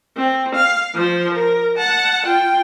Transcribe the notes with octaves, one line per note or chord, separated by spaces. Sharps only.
C4
F5
F3 C5
A#4
F#5 A5
F4 G5